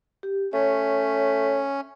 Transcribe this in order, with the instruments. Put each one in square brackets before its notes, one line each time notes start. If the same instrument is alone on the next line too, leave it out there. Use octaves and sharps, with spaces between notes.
[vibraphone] G4
[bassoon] A3 [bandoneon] C#4 [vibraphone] C#5